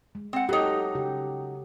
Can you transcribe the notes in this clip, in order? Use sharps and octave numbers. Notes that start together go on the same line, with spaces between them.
G#3
C4 F#5
F#3 D#4 G4 A4 C#5
C#3 G4